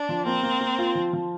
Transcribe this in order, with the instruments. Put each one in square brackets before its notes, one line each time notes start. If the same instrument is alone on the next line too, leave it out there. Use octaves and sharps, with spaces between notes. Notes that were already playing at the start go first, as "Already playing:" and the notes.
Already playing: [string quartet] D4
[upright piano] F3
[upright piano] A#3 [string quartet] C4
[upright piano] A#3
A#3
F4
F3
F3